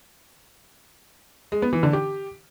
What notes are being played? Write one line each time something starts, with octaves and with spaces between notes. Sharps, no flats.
G#3
B3
E3
D3
G4